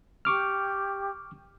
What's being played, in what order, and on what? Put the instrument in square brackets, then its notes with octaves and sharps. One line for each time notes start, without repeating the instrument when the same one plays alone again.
[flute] G4 [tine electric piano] C#6 D6 F6